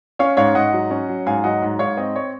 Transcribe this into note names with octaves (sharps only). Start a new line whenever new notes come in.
C#4 C#5 F5
G#2 C#5 F5
G#2 D#5 F#5
F#3
C#4
F#3
G#2 F5 G#5
F#3 D#5 F#5
G#2
G#2 C#5 F5
C4 D#5
C#5